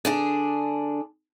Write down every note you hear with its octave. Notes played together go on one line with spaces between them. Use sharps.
D3 D4 G#4